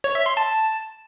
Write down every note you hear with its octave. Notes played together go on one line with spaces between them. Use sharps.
C#5
E5
C6
A5